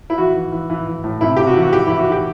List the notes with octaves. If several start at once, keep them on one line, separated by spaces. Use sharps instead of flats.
E4
E3 F#4
E3
E3
E3
E3
A2
C3 E4
C3 G4
F#4
E3
F#4
E3 G4
E4
E3
F#4
E3 G4